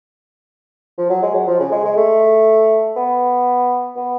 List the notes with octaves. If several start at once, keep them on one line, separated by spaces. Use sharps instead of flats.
F3
F#3
G#3
F#3
F3
C#3
G#3
G#3
A3
B3
B3